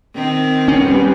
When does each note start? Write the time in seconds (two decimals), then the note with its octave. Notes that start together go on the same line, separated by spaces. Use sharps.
0.16 D#3 C4
0.68 G3 B3 C#4